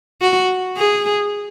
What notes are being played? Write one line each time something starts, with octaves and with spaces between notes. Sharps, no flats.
F#4
G#4